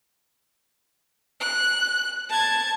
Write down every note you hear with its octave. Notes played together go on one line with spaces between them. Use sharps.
F#6
A5 G#6